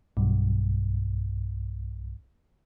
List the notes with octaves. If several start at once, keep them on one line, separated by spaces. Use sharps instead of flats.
B1 G2